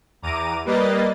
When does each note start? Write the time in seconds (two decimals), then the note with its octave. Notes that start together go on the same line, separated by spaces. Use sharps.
0.22 E2 A#5 D6 D#7
0.65 G3 A#3 B4 D#5 A6